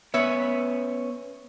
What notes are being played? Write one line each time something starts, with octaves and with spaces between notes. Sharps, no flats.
B3 C#4 B4 C#5 E5